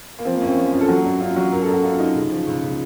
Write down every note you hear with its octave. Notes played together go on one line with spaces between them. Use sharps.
A#3
F3 C4
A#3
F#2 C#4
C4
F3 C#4
F#2 F4
A4
F#3 F#4
F#2
F#2 F4
F#3 F#4
F#2 A#4
A4
F#2
F#4
F#2 F4
F#2 D#4
C#3
F3
C#2
C#3